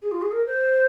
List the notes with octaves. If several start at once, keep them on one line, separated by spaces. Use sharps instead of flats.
G#4
F4
G#4
A#4
C5